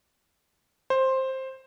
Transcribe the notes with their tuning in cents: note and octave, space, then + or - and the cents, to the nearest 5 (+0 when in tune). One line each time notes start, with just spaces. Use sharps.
C5 +10